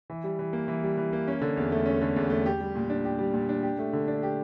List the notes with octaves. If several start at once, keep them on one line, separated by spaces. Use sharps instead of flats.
E3
G3
E3
A#3
E3
G3
E3
A#3
C#4
D3
E2
A3
C#4
D3
E2
A3
G4
G3
A#2
D4
G4
G3
A#2
D4
G4
A3
D3
D4
G4